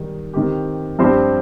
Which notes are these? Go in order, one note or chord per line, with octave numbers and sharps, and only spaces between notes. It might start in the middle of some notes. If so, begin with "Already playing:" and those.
Already playing: D#3 G3 D#4
D#3 C4 G4
G2 F3 C4 G4 C5